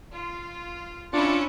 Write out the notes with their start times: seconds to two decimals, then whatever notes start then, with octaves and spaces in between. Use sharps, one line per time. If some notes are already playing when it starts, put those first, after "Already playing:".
0.13 F4
1.13 C#4 D4 E4 F4 C#7